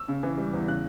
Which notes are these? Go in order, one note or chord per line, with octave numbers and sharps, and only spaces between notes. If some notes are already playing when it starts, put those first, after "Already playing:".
Already playing: E6
C#3
E3
G3
E2
C#3 F#6